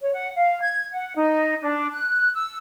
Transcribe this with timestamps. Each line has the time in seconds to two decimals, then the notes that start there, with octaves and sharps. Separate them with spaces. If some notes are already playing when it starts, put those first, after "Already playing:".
0.01 C#5
0.14 F#5
0.35 F5
0.61 G#6
0.93 F#5
1.16 D#4
1.61 D4
1.92 F#6
2.35 E6